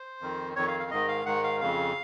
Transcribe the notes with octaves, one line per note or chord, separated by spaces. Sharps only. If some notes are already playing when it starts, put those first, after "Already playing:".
Already playing: C5
F2 D#3
F2 D#3 C#5
F5
F5
G#2 D#3 D#5
F5
G#2 D#3 F#5
F5
F2 C#3 F5